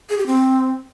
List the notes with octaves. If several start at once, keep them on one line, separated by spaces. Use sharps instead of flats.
G#4
G4
C4